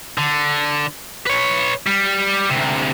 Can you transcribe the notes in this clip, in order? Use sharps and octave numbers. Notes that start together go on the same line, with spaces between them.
D3
B4 C#5
G3
D2 C3